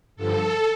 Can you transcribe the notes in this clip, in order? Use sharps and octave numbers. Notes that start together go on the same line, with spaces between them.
G2 D3 F3 A4